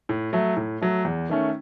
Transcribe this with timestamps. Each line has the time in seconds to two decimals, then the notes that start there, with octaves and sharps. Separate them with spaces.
0.09 A2
0.33 F#3 A3
0.57 A2
0.81 F#3 A3
1.05 E2
1.29 D#3 A3 C#4